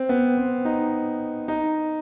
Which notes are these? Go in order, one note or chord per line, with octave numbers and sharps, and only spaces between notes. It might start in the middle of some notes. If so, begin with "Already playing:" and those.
Already playing: C4
B3
C4
D#4
D#4